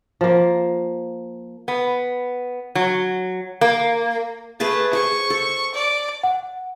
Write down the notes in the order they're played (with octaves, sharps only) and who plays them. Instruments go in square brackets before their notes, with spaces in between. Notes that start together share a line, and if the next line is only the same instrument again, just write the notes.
[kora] F3 A#3
[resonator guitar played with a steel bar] B3
F#3
A#3
[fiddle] A3 [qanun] G#4 B4 A5
[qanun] G#4 C5 [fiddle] C#6
[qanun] A4
[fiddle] D5
[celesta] F#5